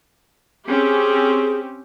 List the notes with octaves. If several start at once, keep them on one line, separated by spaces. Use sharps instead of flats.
C4 C#4 G4 G#4